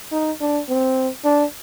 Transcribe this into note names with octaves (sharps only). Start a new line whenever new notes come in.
D#4
D4
C4
D4